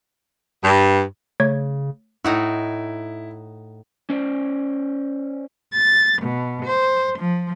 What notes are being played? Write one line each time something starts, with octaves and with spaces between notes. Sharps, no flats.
G2
C#3 A3 C#5 G#6
A2 D#4 E4 F#4
C#4 C5 D5
A6
B2
C5
F3